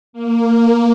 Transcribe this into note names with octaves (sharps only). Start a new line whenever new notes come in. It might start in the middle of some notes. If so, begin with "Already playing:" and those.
A#3